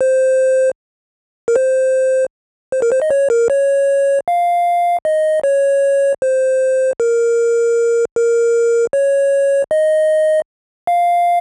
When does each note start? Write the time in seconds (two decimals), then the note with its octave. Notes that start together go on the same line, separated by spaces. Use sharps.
0.01 C5
1.48 A#4
1.56 C5
2.72 C5
2.82 A#4
2.92 C5
3.02 D#5
3.10 C#5
3.30 A#4
3.50 C#5
4.28 F5
5.05 D#5
5.43 C#5
6.22 C5
7.00 A#4
8.16 A#4
8.93 C#5
9.71 D#5
10.87 F5